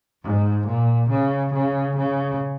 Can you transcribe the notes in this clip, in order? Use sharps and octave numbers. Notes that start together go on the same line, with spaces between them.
G#2
A#2
C#3
C#3
C#3